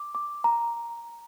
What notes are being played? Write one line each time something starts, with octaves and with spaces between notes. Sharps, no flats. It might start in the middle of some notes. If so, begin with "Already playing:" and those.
Already playing: D6
D6
A#5